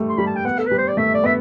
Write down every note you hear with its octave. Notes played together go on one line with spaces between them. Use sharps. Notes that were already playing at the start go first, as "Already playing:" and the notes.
Already playing: G3 A3
C6
G3 B5
A5
G5
B3 F#5
A4
G3 B4
C5
D5
A3 E5
D5
B3 E5